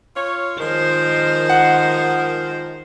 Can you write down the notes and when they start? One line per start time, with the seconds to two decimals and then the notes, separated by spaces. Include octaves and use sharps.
0.16 F4 C#5
0.59 D#3 F3 G#3 A#4 C5
1.49 F#5